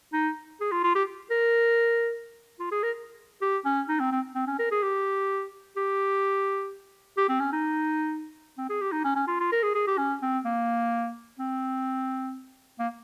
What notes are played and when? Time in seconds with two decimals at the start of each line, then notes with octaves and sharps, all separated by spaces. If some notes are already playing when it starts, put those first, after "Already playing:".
0.13 D#4
0.60 G#4
0.72 F4
0.83 F4
0.95 G4
1.30 A#4
2.59 F4
2.71 G#4
2.83 A#4
3.41 G4
3.65 C#4
3.88 D#4
4.00 C4
4.12 C4
4.35 C4
4.47 C#4
4.59 A#4
4.71 G#4
4.82 G4
5.77 G4
7.17 G4
7.29 C4
7.40 C#4
7.52 D#4
8.58 C4
8.69 G#4
8.81 G4
8.92 D#4
9.04 C#4
9.16 C#4
9.27 F4
9.40 F4
9.52 A#4
9.63 G#4
9.75 G#4
9.87 G4
9.98 C#4
10.22 C4
10.45 A#3
11.39 C4
12.79 A#3